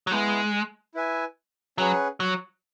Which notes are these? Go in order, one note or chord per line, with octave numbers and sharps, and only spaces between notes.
F#3
G#3 B3 E4 G#4
E4 B4 E5 G#5
F#3 C#4 G#4 B4 F#5
F#3